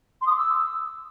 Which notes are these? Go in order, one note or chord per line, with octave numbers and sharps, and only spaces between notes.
C6
D#6
D6
E6